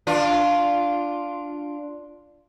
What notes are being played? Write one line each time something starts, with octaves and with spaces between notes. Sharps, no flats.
D4 F4